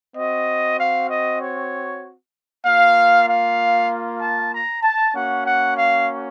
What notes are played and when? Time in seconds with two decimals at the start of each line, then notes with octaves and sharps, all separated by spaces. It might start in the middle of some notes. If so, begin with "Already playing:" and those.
0.16 C4 F#4 D#5
0.78 F5
1.09 D#5
1.40 C#5
2.65 A#3 F4 F5
3.27 F5
4.21 A5
4.51 A#5
4.83 A5
5.14 A#3 C#4 F#4 F#5
5.45 F#5
5.76 F5